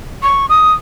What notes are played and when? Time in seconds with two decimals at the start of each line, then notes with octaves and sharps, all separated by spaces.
0.23 C#6
0.49 D#6